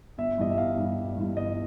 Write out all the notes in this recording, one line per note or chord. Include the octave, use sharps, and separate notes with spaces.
G1 E5
G2 E3 G3 D#5
E5
G1 F5
G2 E3 G3
G1
G2 E3 G3
G1 D#5